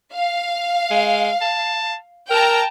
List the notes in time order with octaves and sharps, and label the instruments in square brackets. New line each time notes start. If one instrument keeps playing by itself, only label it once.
[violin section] F5
[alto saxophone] G#3
A5
[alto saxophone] A#4 [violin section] G5 A5 A#5